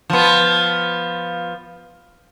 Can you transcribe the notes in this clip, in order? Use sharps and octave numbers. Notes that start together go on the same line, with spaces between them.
F3 B3